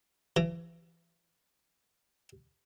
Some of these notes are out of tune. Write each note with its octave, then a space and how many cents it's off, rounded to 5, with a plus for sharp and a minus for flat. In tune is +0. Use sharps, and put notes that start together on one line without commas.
E3 +35